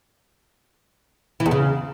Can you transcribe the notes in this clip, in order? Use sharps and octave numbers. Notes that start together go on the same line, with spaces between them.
E3
E2
C#3